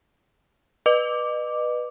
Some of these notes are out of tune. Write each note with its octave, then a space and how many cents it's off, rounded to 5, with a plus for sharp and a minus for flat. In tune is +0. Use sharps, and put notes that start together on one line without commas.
B4 -10 D#5 -35 D6 +0